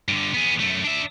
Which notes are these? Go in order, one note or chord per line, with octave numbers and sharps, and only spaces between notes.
G2 D3
B3 G#4
F#2 A3
D4 E5